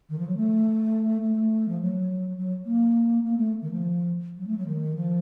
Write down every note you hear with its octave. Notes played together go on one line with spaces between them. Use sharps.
D#3
F3
F#3
A3
A3
F3
F#3
F#3
A#3
A#3
A3
D#3
F3
F#3
A3
F#3
D#3
F3